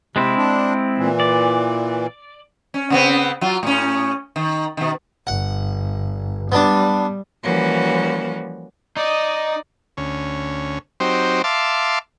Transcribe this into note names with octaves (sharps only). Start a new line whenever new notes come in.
C3 G#3 C4 E4
D4
A#2 E3
D5
C#4
C#3 B3 C4
F#3 F4
A2 C#4
D#3
B2 D#3
G1 F#5
G3 B3 D4
E3 F3 G3 A#3 C#4 F#4
D#4 D5 D#5
D2 C#4
F#3 C4 D#4 G4 C5
E5 F5 A5 C6 D6